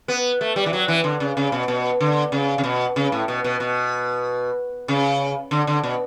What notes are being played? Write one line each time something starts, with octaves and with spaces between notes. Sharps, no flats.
B3
A3
G3
E3
F#3
E3
D3
C#3
C#3
B2
B2
D3
C#3
C#3
B2
C#3
A2
B2
B2
B2
C#3
D3
D3
B2